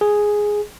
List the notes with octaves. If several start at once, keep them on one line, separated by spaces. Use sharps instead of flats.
G#4